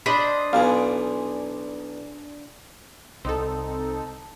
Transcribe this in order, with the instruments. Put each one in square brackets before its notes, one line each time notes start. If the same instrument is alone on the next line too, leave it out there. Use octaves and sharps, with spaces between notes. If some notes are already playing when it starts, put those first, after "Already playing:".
[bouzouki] D4 C5 D#5 [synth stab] B5
[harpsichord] B1 B2 E3 [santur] D5 G#5 D#6 [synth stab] F5
[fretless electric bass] C2 [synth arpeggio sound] C4 D#4 A4